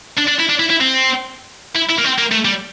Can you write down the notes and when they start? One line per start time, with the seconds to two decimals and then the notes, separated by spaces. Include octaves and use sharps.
0.17 D4
0.27 D4
0.39 E4
0.49 D4
0.59 E4
0.70 E4
0.80 C4
1.75 E4
1.89 E4
1.98 A#3
2.04 C4
2.18 A#3
2.31 A3
2.45 G3